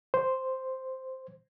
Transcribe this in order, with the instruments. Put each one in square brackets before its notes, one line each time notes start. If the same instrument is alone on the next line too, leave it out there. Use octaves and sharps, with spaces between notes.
[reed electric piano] C5